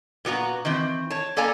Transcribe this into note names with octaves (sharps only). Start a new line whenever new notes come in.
A#2 B3 F#4 A#5
D#3 E3 C4
C#5 A5
A#3 A4 D5 F5 G#5 A#5